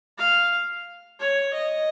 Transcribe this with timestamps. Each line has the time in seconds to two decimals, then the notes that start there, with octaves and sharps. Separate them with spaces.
0.18 F5
1.19 C#5
1.54 D#5